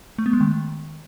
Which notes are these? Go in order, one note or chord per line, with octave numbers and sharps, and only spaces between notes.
A3
B3
G#3
D#3